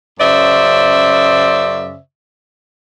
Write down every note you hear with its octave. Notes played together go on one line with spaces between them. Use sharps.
F#2 C#3 C5 D5 E5